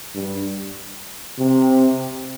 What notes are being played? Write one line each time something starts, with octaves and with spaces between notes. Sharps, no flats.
G2
C3